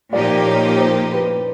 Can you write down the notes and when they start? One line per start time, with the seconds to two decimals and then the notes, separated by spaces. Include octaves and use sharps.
0.12 A#2 F3 A#3 D#4 G4 D5
0.46 C#5
0.78 C5
1.12 B4